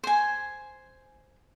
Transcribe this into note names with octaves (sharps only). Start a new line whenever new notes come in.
C5 G#5